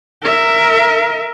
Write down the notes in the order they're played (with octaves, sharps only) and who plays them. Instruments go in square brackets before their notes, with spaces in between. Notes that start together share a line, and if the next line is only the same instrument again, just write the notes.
[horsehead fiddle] A#4 E5